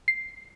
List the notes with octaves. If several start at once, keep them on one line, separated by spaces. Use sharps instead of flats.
C7